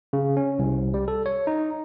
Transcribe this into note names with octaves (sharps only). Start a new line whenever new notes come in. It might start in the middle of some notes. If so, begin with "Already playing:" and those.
C#3
C#4
C2
G3
A4
C#5
D#4